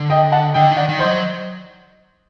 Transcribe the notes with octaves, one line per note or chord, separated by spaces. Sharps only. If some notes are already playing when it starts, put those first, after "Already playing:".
Already playing: D3
D#5 G5
F#5 A5
D3 D#5 G5
D#3
D5 F#5
D#3
C5 D#5
F#3